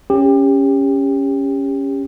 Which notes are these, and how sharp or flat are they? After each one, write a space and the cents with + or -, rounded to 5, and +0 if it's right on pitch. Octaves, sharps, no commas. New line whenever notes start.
C#4 +0 G4 +25